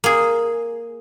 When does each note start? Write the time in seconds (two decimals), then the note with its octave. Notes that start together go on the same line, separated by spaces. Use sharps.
0.04 A#3 G#4